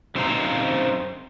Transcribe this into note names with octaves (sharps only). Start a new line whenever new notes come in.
F#2 C4 D#4 C5 F5 A#5